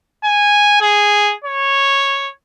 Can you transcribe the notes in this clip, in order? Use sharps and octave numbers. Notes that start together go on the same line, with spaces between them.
G#5
G#4
C#5